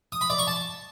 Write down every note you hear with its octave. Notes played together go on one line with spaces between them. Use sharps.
D#6
B5
D5
C#6
A5